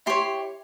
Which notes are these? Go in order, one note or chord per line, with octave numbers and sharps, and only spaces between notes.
E4 G4 C#5 C6